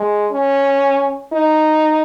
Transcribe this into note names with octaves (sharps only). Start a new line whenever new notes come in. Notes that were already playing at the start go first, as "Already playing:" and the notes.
Already playing: G#3
C#4
D#4